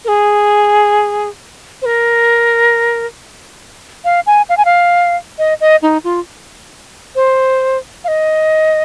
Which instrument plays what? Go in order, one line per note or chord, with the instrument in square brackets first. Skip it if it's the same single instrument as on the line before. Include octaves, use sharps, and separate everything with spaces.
[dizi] A#4
G#4
C5
A#4
F5
G#5
F5
G#5
F5
D#5
D#5
D#4
F4
C5
F5
D#5